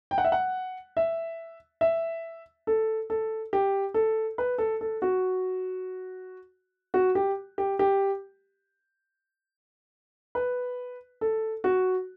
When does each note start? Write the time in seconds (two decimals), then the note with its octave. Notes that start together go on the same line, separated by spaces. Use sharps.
0.11 G5
0.18 F#5
0.24 E5
0.32 F#5
0.97 E5
1.81 E5
2.67 A4
3.10 A4
3.53 G4
3.94 A4
4.38 B4
4.58 A4
4.81 A4
5.02 F#4
6.94 F#4
7.15 G4
7.58 G4
7.79 G4
10.35 B4
11.21 A4
11.64 F#4